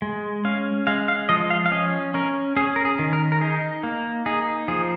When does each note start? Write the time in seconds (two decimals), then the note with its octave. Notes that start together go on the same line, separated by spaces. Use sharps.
0.02 G#3
0.45 C#4 F5
0.87 G#3 F5
1.08 F5
1.29 F3 D#5
1.50 F5
1.66 F5
1.72 C#4 D#5
2.14 C#4 A#4
2.56 C#4 G#4
2.76 A#4
2.85 G#4
2.99 D#3
3.13 A#4
3.32 A#4
3.41 D#4 G#4
3.83 A#3
4.26 D#4 G#4
4.68 F3 G#4